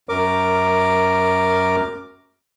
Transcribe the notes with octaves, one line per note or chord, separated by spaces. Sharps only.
F#2 A#4 D6